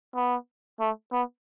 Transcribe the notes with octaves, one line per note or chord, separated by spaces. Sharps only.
B3
A3
B3